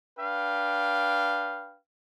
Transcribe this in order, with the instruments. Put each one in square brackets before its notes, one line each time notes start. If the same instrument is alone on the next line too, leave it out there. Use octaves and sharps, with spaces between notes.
[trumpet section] D4 B4 F5 G5